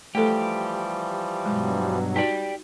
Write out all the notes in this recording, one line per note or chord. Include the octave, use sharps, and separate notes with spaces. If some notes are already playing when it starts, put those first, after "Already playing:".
E3 F3 G3 A3 G4 A4
G2 B2 F#3 G#3
D#4 F#4 G4 D5 A5